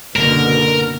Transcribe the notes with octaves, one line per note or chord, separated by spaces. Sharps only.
F#1 B2 D3 A#4